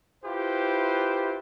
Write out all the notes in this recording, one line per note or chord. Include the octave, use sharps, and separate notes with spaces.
E4 F4 G4 B4 C5